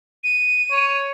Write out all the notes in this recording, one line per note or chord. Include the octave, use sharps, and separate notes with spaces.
D#7
C#5